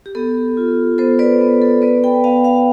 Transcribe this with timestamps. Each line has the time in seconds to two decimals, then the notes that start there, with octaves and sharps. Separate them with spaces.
0.06 G4
0.15 B3 A4
0.57 F4
0.98 B3 A4 C5
1.19 B4 D5
1.41 B3
1.62 A4
1.82 B3 B4 D5
2.04 G5 B5
2.24 B3 F5 A5
2.44 F5 A5